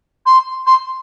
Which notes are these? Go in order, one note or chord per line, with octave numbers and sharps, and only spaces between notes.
C6
C6